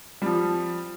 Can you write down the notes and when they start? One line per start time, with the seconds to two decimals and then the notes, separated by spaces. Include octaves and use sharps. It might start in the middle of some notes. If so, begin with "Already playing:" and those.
0.22 F3 G3